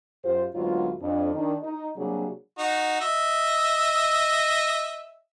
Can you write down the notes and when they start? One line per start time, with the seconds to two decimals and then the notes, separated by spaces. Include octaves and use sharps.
0.25 F#2 F4 G4 C5
0.55 D2 G#2 F#3 B3 F4
1.02 F2 D4
1.35 D#3 D4 D#4
1.64 D#4
1.98 C3 F#3 G3 A#3 D4 G#4
2.58 D#4 F#4
3.01 D#5 E5